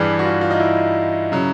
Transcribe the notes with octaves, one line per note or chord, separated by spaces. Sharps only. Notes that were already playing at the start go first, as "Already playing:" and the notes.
Already playing: G2 E3 G3 G#4
F#4
F4
F4
D#4
E4
C#3 F#3